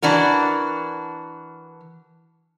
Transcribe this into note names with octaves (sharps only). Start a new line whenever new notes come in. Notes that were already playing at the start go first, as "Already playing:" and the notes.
E3 D4 F#4 A#4